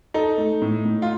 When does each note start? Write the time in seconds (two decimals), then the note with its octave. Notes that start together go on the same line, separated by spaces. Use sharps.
0.14 D#4 A4
0.37 A3
0.62 A2
0.85 A2
1.02 F4